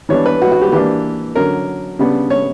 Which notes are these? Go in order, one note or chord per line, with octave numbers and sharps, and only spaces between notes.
E3 G3 B3 D4 C#5
B4
F#4
F#4
G4
E3 A#3 D4 G4
D3 F#3 C#4 A#4
C#3 G3 B3 D4
C#5